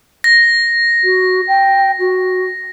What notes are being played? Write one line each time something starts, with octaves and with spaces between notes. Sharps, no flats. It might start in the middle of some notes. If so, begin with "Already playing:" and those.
A#6
F#4
G5
F#4